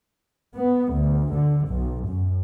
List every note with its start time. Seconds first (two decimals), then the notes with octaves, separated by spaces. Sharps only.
0.56 B3
0.93 D2
1.33 D3
1.68 B1
2.07 F#2